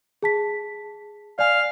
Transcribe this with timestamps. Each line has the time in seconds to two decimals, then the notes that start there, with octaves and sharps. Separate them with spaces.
0.22 G#4 A5 B6
1.39 D5 F5 G#5